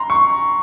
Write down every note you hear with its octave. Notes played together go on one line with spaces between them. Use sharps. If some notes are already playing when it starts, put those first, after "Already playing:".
Already playing: A#5 C6
C#6